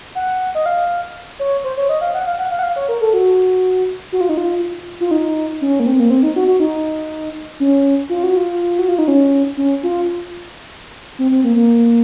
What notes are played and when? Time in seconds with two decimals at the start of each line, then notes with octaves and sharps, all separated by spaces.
0.15 F#5
0.55 D#5
0.66 F5
1.39 C#5
1.64 C5
1.77 C#5
1.89 D#5
2.01 F5
2.14 F#5
2.27 F5
2.39 F#5
2.51 F5
2.59 F#5
2.63 F5
2.76 C#5
2.89 A#4
3.01 A4
3.13 F#4
4.12 F#4
4.21 F4
4.29 D#4
4.37 F4
5.00 F4
5.11 D#4
5.61 C#4
5.80 A#3
5.86 C4
6.00 A#3
6.10 C4
6.23 D#4
6.36 F#4
6.48 F#4
6.60 D#4
7.60 C#4
8.09 F4
8.23 F#4
8.37 F4
8.79 F#4
8.89 F4
8.99 D#4
9.08 C#4
9.57 C#4
9.83 F4
11.19 C4
11.32 C4
11.44 A#3
11.56 A#3